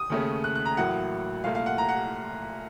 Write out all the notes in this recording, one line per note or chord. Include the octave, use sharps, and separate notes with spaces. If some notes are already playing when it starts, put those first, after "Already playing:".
Already playing: D#6
D#2 C#3 A3 C#4
F#6
F#6
A#5
A1 A2 F#3 A#3 F#5
C2 A#2 A3 F5
F5
F#5
A#5
F#5